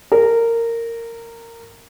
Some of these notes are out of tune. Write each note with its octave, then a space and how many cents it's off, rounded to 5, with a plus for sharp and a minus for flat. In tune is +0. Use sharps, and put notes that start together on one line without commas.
A#4 -15